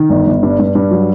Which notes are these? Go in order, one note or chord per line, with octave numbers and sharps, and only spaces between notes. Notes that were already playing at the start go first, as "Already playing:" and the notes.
Already playing: D#3
G1
G1
G2
G2
G2
F#3